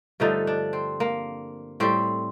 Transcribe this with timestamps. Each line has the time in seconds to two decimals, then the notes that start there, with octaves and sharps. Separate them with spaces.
0.20 G2 D3 F3 A3 D#4
0.47 D4
0.73 C4
1.00 A#3
1.80 A2 G3 C4